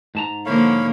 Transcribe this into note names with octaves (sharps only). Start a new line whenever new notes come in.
G#2 A5 A#5
D3 F3 A#3 C#5 F5 B5